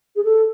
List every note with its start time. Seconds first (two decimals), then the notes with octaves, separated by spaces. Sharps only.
0.16 G#4
0.24 A4